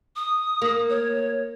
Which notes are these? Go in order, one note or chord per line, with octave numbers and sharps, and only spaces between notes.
D#6
A#3
C#5